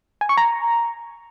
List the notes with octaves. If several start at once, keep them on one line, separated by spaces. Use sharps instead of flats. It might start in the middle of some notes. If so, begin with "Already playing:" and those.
G#5
C#6
A#5